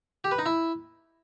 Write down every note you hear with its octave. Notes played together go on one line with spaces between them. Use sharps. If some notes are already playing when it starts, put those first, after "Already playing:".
G4
B4
D#4
E4